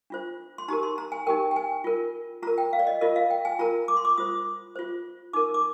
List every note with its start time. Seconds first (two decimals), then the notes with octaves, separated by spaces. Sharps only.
0.10 D4 F4 C5
0.58 C6
0.68 D#4 G4 A#4 A#5
0.83 C6
0.98 A#5
1.12 G#5
1.27 D#4 G4 A#4 G5
1.51 G5
1.56 G#5
1.84 F4 A#4
2.42 F4 A#4 A#5
2.58 G5
2.73 F5
2.79 D5
2.87 D#5
3.01 F4 A#4 D#5
3.16 F5
3.30 G5
3.45 G#5
3.59 F4 A#4 A#5
3.88 D6
3.97 C6
4.05 D6
4.17 F4 C5 D#6
4.76 F4 C5
5.33 D#4 A#4 D6
5.54 D6